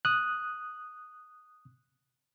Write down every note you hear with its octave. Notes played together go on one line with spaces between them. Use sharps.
D#6 F#6